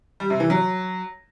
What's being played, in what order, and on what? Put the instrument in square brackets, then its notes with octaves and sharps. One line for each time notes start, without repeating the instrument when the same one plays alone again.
[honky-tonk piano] G3
C3
E3
F#3